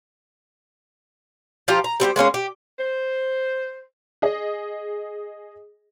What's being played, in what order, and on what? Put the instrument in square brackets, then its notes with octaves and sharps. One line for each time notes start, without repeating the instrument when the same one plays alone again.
[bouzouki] F3 F4 G4 A#5
A#5
G3 C4 F#4 G4
G#3 A#3 C#4 G#4
G4
[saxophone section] C5
[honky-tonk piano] G#4 D#5